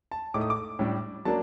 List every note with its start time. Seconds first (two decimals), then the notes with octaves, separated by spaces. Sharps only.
0.12 A5
0.34 A2 A3 D#4 D6
0.41 D#6
0.50 D6
0.79 A2 G3 D4
1.25 F#3 A#3 D4 A5